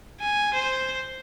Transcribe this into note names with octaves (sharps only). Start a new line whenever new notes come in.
G#5
C5